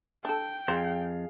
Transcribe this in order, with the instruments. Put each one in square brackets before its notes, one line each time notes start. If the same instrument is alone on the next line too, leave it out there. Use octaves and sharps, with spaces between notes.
[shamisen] D4 A4 [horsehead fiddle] G5
[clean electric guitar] F2 [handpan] G#4 F5 [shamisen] C5